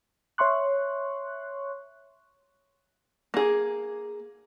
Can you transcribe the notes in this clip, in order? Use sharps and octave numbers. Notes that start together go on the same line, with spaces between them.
C#5 E5 C6 C#6 F#6
A#3 G#4